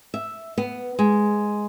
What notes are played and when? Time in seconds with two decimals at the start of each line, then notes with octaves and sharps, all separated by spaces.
0.14 E5
0.58 B3
0.99 G#3